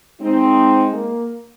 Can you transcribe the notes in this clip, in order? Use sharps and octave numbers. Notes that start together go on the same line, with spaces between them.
G#3 C4 D#4
A#3